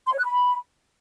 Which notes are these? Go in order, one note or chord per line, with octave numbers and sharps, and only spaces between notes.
C6
C#5
F#6
B5